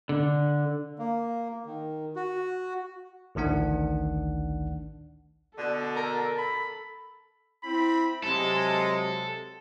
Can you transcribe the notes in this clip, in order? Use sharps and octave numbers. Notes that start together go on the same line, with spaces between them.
D3
A#3
D#3
F#4
A1 D2 D#3 D4 F#5
B2 D3 A4
A#4
B5
C4 E4 B5
C3 F#3 G#3 A4